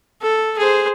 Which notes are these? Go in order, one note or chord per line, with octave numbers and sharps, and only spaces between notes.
A4
G#4 C5